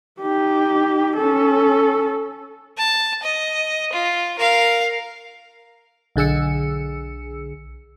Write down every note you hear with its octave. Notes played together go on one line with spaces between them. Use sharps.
D#4 G4
C#4 A4
A5
D#5
F4
A#4 F5
B1 D3 G#4 E6 C#7